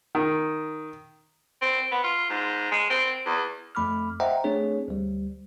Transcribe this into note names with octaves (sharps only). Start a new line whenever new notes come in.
D#3
C4
B3
F4
G#2
G#3
C4
E2
F2 A3 B5 D6 F6
C5 D#5 E5 F#5 G5 A#5
A3 C4 D4 G#4 C#5
D2 G3